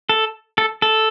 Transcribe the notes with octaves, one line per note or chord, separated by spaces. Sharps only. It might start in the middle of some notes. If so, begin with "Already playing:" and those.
A4
A4
A4